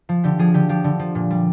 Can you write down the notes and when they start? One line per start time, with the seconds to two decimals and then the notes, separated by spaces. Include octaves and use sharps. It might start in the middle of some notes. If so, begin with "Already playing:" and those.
0.09 F3
0.24 D3 G4
0.39 F3 G#4
0.54 D3 G4
0.69 F3 G4
0.84 D3
0.99 F3
1.15 A#2
1.31 G3